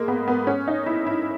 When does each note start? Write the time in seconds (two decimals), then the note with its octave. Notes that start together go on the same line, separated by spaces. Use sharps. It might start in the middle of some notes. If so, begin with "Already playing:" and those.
Already playing: G#3 A#3
0.08 B3
0.28 B3
0.47 C#4
0.68 D#4
0.86 E4
1.07 E4